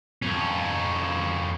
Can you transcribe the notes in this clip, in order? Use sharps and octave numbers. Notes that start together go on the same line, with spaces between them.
F2 C#4